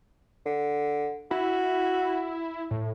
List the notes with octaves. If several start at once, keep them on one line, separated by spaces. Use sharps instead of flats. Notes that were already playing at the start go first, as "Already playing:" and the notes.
D3
E4 F#4
A2